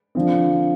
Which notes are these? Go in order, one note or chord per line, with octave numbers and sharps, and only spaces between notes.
D3 F3 C4